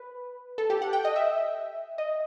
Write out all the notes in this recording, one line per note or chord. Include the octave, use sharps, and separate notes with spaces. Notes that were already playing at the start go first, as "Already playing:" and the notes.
Already playing: B4
A4
G4
F#5
G5
D#5
E5
D#5